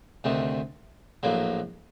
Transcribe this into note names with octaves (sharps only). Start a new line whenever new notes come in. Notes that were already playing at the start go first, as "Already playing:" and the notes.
D2 C3 D#3 A3
A#1 A2 F#3 A#3